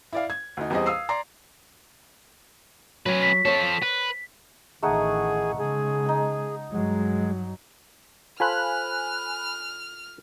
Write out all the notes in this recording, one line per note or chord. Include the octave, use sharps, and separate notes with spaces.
E4 D5 F5
G#6
D2 D#4
E2 G3 C4 G#4 D#5
F5 D#6 E6 C7
D5 A#5 C6 C7
F#3 C#4 B4
B6
F3 A4 C5 C#5
B4
A1 D#3 A3 D#4 G#4 F#5
C#3 G#3 G#4
D#4 G#5
G2 F#3 G#3
F4 A4 C5 G#5 B5 F6 F#6